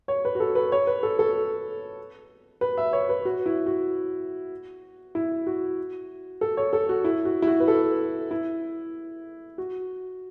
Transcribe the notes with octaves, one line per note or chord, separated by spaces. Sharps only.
C#5
B4
F#4
A4
B4
C#5
B4
A4
A4
B4
E5
C#5
B4
F#4
E4
F#4
E4
F#4
A4
C#5
A4
F#4
E4
F#4
E4
F#4
B4
A4
E4
F#4